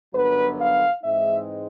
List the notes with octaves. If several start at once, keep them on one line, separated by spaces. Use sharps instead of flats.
G1 F#2 D3 F#3 B3 B4
F5
G#2 E3 G#3 C4 D#4 E5